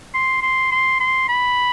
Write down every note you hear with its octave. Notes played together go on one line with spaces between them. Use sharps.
C6
C6
C6
C6
B5